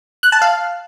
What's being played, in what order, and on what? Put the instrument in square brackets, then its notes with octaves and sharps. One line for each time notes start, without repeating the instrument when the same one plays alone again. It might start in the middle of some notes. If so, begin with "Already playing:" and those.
[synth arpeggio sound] F#6
A5
F5